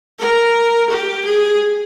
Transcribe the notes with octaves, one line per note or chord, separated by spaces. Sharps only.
A#4
G4
G#4